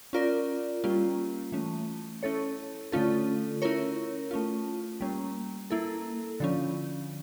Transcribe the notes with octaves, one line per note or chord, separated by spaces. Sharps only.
C#4 F4 A#4 D5
G3 A#3 C#4 F4
E3 A3 C#4
C#4 E4 A4 C#5
D3 A3 C#4 F4 A4
C#4 E4 A#4 C#5
A3 C#4 F4
G3 A#3 C#4
A#3 E4 A4
D3 F3 C#4